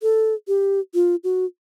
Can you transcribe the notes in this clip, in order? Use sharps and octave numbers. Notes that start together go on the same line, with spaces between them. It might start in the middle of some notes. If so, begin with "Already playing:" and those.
A4
G4
F4
F#4